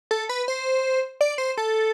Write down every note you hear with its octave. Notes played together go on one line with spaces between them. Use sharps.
A4
B4
C5
D5
C5
A4